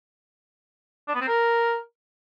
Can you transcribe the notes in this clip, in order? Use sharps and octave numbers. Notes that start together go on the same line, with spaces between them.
D4
B3
C4
A#4